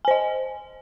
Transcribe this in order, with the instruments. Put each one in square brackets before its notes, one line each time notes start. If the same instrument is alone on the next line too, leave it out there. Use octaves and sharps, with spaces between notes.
[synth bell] G#5
C5
D#5